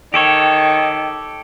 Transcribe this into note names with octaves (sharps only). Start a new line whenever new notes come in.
D#3 G4 A4 C#5